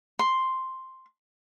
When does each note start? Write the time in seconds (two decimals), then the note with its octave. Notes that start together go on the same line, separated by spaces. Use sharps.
0.19 C6